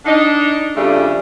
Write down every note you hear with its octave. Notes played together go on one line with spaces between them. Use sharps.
D4 D#4
F2 C#3 G3 A3 D4 E5